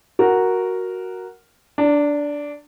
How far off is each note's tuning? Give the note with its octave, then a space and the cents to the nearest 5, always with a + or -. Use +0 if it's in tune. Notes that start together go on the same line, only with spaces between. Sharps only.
F#4 +0 A#4 +0
D4 -10 A5 +45